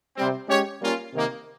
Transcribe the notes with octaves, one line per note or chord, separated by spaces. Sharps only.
C3 G3 C4
G#3 C#4 G4 C#5
G3 A#3 C#4 F4
C3 D#3 A#3 D#4